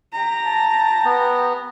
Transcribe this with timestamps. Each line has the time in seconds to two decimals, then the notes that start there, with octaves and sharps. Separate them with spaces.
0.12 G4 A#5
0.45 A5
1.05 B3